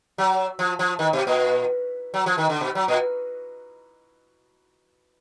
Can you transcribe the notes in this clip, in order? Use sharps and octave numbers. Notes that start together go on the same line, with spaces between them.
F#3
F3
F3
D#3
B2
A#2
F#3
F3
D#3
D3
B2
F#3
A#2